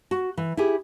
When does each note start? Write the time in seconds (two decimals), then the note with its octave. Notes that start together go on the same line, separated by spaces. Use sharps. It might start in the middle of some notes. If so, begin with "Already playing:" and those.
0.11 F#4
0.37 E3
0.57 E4 G4 G#4